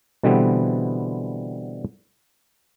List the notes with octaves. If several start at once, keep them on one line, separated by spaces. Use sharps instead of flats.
B2 D3 E3 G3 B3 C4